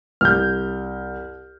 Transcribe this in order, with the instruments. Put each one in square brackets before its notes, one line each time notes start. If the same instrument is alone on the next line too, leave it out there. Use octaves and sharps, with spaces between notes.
[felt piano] C2 [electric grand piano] F6 G6